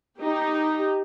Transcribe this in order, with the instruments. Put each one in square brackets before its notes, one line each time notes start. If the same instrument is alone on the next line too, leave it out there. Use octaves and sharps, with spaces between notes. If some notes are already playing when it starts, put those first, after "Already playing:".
[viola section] D#4 G4